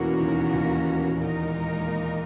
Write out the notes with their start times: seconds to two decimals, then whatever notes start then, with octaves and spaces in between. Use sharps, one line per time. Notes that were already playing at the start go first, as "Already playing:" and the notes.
Already playing: E2 B2 E3 A#3 C#4 F#4 A#4
0.20 D#2 D#3
0.53 D#2 D#3
1.18 A#2 G#3 D#4 A#4